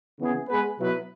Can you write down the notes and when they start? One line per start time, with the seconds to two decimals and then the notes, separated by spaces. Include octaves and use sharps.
0.19 C#3 E3 B3 G#4
0.48 G#3 B3 G#4 B4
0.78 B2 F#3 B3 E4 B4